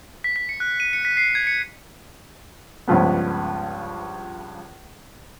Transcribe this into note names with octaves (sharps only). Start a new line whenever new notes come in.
B6
B6
C#7
F#6
D#7
C#7
B6
C7
G#6
C#7
C#2 G2 F3 B3